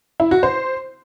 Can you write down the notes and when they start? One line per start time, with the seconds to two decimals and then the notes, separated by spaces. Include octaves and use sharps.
0.20 E4
0.31 F#4
0.43 C5